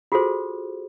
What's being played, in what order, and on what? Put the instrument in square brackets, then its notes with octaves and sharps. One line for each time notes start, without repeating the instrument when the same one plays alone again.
[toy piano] F4 F#4 G#4 A4 C5